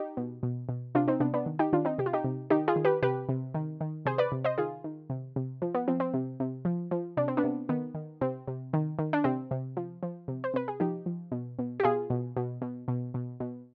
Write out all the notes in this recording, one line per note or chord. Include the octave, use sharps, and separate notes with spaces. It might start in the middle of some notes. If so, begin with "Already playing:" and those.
Already playing: D#4 G4
B2
B2
B2
C3 D4 F4
C4 D#4
C3 B3 D4
B3 D4
D#3
D#4 G4
D#3 D4 F4
C4 D#4
C3 G4
F4
D#4 G4
C3
D#3 D#4 G4
F4 G#4
D#3
G4 B4
C3 G4 B4
C3
D#3
D#3
C3 G#4 C5
B4 D5
C3
C5 D#5
D#3 F4 G#4
D#3
C3
C3
F3
B3
F3 C4
C4
C3
C3
F3
F3
C3 D4
C4
B3 D4
C3
D#3 B3
D#3
C3 C4
C3
D#3
D#3
D4
C3 C4
C3
F3
F3
C3
C5
C3 B4
G#4
F3 D#4 G4
F3
B2
B2
G4
B2 F4 G#4
B2
B2
B2
B2
B2
B2